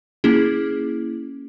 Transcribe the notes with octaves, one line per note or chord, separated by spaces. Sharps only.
A#3 C#4 E4 G#4